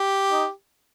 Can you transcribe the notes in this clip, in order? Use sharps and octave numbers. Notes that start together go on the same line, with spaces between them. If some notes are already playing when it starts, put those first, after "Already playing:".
Already playing: G4
D#4